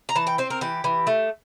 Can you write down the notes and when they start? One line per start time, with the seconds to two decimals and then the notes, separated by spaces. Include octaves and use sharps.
0.09 A#5
0.15 E3 A5
0.27 G5
0.38 C4 C5
0.50 A#4
0.61 E3 G4
0.84 E3
1.07 A3